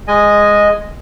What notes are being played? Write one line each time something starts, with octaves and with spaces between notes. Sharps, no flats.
G#3 D#5 G#5